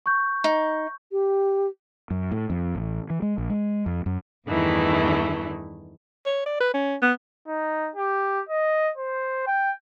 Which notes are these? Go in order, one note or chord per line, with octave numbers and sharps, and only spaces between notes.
C#6 G6
D#4
G4
F#2
A2
F2
A1
E3
G#3
A#1
G#3
F2
F#2
E2 G2 D#3 E3 A3 E4
C#5
D5
B4
C#4
B3
D#4
G4
D#5
C5
G5